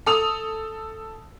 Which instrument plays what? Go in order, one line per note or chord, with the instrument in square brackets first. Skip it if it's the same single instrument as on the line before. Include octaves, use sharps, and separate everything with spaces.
[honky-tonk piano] A4 D#6 F7